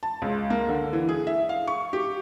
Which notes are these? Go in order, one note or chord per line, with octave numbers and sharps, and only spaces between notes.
A5
C#2
A#3
D3
E3
G#4
E5
F5
C#6
G4